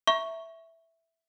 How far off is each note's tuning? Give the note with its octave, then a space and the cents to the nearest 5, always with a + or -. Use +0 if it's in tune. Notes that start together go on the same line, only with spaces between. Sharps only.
E5 +0 A#5 +0 C#6 +0